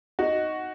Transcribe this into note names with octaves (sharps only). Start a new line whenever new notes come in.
D#4 F#4